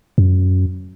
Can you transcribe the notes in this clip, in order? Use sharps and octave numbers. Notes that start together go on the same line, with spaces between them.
F#2